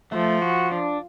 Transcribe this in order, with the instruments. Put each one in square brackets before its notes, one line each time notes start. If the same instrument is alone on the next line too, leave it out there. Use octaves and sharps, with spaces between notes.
[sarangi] F3 [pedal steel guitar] A3
[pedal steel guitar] F#4
D4